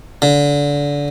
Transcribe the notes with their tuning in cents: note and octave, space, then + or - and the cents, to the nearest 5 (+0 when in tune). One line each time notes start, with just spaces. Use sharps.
D3 -25